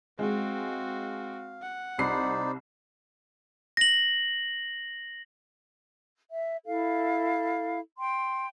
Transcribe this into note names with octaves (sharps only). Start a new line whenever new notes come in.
G#3 C4 F#4 F5
F#5
C2 D#4 C5 D5 B5 C7
A#6 F#7
E5
E4 A4 F5
G5 C6